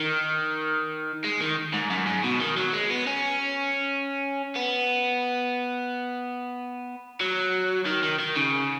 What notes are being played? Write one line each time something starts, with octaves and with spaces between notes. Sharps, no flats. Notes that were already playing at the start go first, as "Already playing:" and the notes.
Already playing: D#3
G#3
D#3
G#2
F#2
G#2
B2
D#3
F#3
G#3
B3
C#4
B3
F#3
D#3
D#3
D#3
C#3